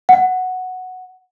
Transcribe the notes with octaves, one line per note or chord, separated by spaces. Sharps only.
F#5